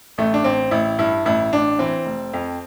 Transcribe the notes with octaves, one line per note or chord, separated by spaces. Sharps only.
A1 A3
D4
A1 C4
A1 E4
G2 E4
A1 E4
A1 D4
E3 C4
F1
F2